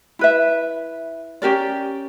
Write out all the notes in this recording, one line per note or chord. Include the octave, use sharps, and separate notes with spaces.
E4 B4 E5
C#4 G4 A#4 D5